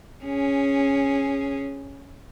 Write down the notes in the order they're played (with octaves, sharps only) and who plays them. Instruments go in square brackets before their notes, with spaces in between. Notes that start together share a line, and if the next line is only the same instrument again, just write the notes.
[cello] C#4 G#4